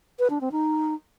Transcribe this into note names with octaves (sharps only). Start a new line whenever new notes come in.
B4
D4
C4
D#4